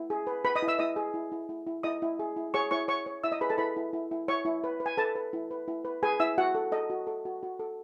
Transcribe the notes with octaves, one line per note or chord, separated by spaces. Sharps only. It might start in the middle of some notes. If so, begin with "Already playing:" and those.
Already playing: E4
G#4
B4
B4 B5
D#5 D#6
E4
E5 E6
E4 D#5 D#6
G#4
E4
E4
E4
E4
E4 D#5 D#6
E4
G#4
E4
G#4 C#5 C#6
E4 C#5 C#6
C#5 C#6
C#5
E4 E5 E6
D#5 D#6
G#4 B4 B5
A4 A5
E4 B4 B5
E4
E4
E4
E4 C#5 C#6
E4
B4
B4
G#5
A4 B4 A5
B4
E4
B4
E4
B4
G#4 B4 G#5
E4 E5 E6
F#4 F#5
A4
A4 D#5
F#4
A4
F#4
F#4
A4